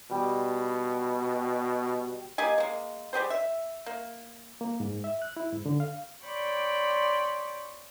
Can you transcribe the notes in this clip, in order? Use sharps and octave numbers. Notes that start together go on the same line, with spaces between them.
B2 G3
A#3 G4 D#5 G#5
G#3 A#3
G3 G4 G#4 C5
E5
A#3
A#3
G#2
E5
F#6
E4
G#2
D3
F5
C#5 D5 G5 B5 C6